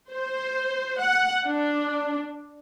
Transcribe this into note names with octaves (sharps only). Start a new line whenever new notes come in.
C5
F#5
D4